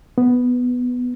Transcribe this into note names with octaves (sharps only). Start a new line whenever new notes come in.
B3